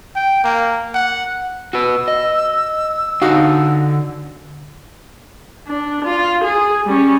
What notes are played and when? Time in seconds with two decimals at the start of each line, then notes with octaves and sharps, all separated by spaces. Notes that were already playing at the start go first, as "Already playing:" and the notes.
0.16 G5
0.44 A#3
0.94 F#5
1.73 F#4 B4 E6
2.08 D#5
3.22 D3 D#4 F#4 F5
5.67 D4
6.04 F4
6.44 G#4
6.86 G3 C#4